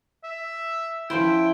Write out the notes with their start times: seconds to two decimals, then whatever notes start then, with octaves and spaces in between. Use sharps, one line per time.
0.24 E5
1.10 F3 C#4 E4 C5 G5